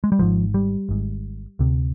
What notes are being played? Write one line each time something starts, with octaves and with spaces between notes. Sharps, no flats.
G#3
G3
G#1 G#2 F3
G3
G#1 G#2
D2 C3